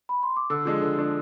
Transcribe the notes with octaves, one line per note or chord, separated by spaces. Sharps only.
B5
C6
D6
D3 E6
F3 G#3 D4
D3
F3 G#3 D4